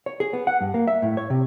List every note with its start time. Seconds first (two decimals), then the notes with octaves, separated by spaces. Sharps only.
0.06 C#5
0.20 G#4
0.33 B3
0.47 F#5
0.61 G2
0.74 A#3
0.88 E5
1.02 A2
1.17 C#5
1.30 C3